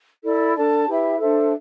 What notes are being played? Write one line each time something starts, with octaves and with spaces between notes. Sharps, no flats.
E4 A4 D5
D4 A4 D5 A5
E4 G4 B4 E5
D4 A4 C5 E5